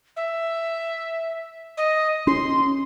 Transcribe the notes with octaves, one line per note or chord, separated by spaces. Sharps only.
E5
D#5
C#4 C6